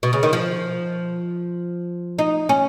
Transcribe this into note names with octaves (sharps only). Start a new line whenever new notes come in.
B2
C#3
D#3
F3
D#4
C#4